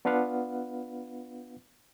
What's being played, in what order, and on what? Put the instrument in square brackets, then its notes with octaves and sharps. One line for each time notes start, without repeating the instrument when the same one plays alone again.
[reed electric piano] B3 D4 F4 B4 F5 F#5